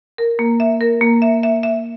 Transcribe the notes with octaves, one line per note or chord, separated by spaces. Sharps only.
A#4
A#3
E5
A#4
A#3
E5
E5
E5